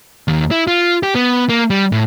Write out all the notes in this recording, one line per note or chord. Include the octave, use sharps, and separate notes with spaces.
D#2
E4
F4
G4
B3
A#3
G3
A2